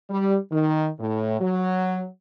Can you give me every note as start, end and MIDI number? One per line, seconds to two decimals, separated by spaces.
0.11 0.37 55
0.51 0.88 51
0.99 1.36 45
1.40 2.05 54